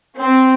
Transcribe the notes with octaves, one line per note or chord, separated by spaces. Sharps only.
C4